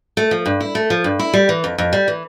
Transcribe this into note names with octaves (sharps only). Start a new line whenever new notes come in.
A3
F3
G2
E4
A3
F3
G2
E4
G3
E3
F2
F2
G3
E3